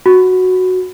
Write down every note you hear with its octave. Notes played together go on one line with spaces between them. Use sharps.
F#4